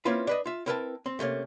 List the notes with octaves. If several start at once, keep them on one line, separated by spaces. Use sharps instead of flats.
A#3 C4 C#4 E4 F4 B4
D4 B4 D#5
F4 E5
C4 E4 A#4 B4 G5 A5
C4
C3 A3 A#3 C#4